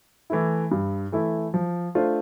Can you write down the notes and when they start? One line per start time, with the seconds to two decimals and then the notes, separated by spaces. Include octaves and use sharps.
0.30 E3 A3 E4
0.71 G2
1.12 E3 A3 E4
1.54 F3
1.95 A3 D4 F4 C5